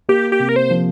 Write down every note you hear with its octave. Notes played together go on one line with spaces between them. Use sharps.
A#3 G4
G4
C3
A#4
C5
F3